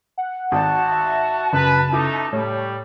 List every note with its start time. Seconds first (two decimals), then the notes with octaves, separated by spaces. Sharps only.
0.18 F#5
0.52 G#1 F#4 A5
0.92 E5
1.53 F#2 C#3 B4
1.92 A3 D#4 E4 D6
2.33 A2 G3 C#5